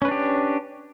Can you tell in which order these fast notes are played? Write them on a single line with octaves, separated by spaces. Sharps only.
C#4 B4 D4 G4